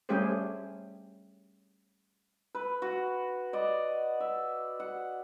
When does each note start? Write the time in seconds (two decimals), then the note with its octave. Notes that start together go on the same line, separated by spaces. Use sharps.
0.09 G3 A3 C#4 G4 G#4 C5
2.55 B4
2.82 F#4
3.53 D5 D#5
4.20 E5
4.80 F#5